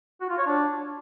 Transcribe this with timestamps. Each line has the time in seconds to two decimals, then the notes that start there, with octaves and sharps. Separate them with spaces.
0.21 F#4
0.29 F4
0.38 C#5
0.46 D4